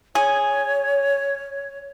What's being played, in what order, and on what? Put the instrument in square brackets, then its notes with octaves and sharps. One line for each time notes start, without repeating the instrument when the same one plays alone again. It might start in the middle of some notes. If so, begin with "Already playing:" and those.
[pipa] G#4 [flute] C#5